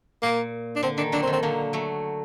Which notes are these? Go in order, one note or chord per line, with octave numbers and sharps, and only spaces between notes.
A#2 A#3
D4
D3 C4
D#3 D4
D3 F#3 D4
C4
D#3
C4
D3 F#3 A#3
F#3 A3